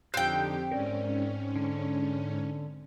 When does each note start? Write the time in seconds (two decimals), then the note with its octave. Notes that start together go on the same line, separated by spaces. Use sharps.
0.14 F2 D3 C4 D#4 G4 G5 F#6
0.72 G#2 C#4 A#4 D5
1.56 D3